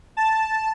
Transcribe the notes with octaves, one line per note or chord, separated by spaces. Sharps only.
A5